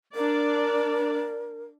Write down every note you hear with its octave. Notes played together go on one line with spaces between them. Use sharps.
D4 A#4 D5